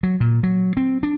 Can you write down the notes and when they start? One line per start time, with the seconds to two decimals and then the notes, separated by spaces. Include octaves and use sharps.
0.03 F#3
0.20 A#2
0.43 F#3
0.77 C4
1.03 D4